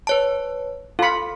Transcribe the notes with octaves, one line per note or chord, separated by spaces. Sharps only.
B4 C#5 A5
F4 A4 B5 C#7